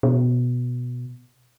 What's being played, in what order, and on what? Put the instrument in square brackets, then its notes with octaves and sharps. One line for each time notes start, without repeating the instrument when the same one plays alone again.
[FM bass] B2